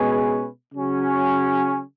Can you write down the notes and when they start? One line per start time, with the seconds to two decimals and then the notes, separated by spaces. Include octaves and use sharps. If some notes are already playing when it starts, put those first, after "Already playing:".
Already playing: B2 G#3 C#4 G#4 B4
0.74 C#3 F#3 C#4